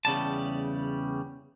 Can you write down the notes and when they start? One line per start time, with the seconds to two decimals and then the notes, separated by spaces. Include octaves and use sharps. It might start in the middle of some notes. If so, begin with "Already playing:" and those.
0.05 E2 C#3 G3 A5